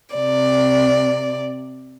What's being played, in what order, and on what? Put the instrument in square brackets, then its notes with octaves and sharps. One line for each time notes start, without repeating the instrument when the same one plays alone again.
[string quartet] C3 D5